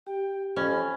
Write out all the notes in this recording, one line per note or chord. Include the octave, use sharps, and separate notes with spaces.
G4 G5
F2 C#4 B5